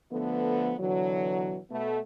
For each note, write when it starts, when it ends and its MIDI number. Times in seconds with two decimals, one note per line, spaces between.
0.11 0.74 50
0.11 0.74 53
0.11 0.74 57
0.11 0.74 59
0.79 1.58 47
0.79 1.58 50
0.79 1.58 52
0.79 1.58 54
1.70 1.99 47
1.70 1.99 57
1.70 1.99 59